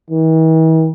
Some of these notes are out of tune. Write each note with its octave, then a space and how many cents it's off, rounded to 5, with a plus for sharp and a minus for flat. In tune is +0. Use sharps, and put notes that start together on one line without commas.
E3 -45